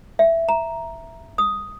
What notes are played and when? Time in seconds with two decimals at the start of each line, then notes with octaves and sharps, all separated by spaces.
0.19 E5
0.49 A#5
1.38 D#6